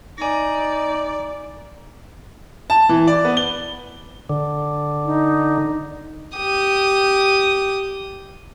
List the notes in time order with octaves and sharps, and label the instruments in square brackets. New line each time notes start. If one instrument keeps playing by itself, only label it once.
[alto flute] D#4 [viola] D5 [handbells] G#5 A#6
[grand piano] A5
E3
D5
B3
G7
[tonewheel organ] D3
[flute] D#4
[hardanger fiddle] G4 D#6